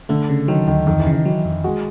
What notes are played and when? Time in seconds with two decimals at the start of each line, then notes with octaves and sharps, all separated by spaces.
0.09 D3 A3
0.29 C#3
0.48 D#3 F#3
0.67 D2 D#3
0.87 F2 D#3
1.00 E3
1.06 C#3
1.12 D#3
1.25 D#3 F#3
1.45 F2
1.64 G#3 F#4